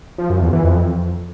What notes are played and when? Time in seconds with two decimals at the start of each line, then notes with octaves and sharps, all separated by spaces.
0.18 F3
0.30 F#2
0.41 E2
0.53 E3
0.64 F2